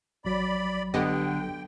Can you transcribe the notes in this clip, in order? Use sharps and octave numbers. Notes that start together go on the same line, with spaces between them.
A1 F#3 D5 B5
D3 B3 G4 D#5 G5